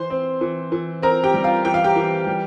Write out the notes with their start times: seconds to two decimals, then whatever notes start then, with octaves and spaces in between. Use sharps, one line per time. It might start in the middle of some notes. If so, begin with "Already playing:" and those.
Already playing: E3 C5 C6
0.10 C4
0.41 E3
0.72 E3
1.02 C4 A#4 A#5
1.24 G4 G5
1.34 G3
1.44 F4 F5
1.65 E3 G5
1.74 F5
1.84 G4 G5
1.96 E3
2.27 G3